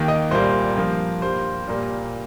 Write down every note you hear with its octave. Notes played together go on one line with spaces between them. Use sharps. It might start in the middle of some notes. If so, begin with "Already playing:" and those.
Already playing: D#2 D#3 A#3 G5
D#5
C2 A#2 G3 A#3 C5
G2 F3 A#3
G2 G3 A#3 C5
A#2 G3 A#3